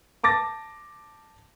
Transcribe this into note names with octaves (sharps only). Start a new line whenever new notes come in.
A5 D6 A6 A#6